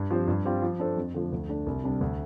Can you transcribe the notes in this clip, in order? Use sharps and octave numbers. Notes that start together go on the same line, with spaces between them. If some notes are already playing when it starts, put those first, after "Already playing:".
Already playing: G2
F3 C4 G4 C5
G2
G3 C4 F4
F3
D4 A4 C5
F2
D3 F3 A3
D2
D3 A3 D4
C2
C3 G3 D4
D2